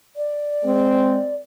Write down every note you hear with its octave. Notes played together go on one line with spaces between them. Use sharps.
D5
G#3 C4